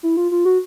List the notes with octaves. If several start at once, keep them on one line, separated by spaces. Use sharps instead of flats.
E4
F4
F4
F#4